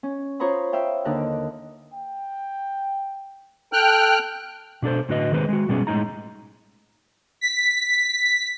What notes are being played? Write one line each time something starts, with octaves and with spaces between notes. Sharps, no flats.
C#4
F4 C5 C#5 A#5 B5 D#6
E5 F5 G5
D#2 D3 D4 D#4 F#6
G5
A4 G5 F6 F#6
B2 D4 A4 C5
A2 D3 F#4 B4 D#5
D#3 G#3 C4 B4
G#3 F#4
B2 G3 B3 C#4 G#4
A2 E3 G#3 D#4 A#5
B6